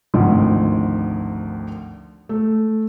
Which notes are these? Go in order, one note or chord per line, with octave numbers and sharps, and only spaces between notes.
G#1 D2 D#3 F3
A3